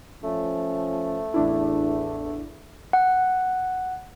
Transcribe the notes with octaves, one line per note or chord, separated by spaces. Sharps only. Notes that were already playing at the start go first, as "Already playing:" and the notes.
F3 A3 C#4
A1 E2 D4 E4
F#5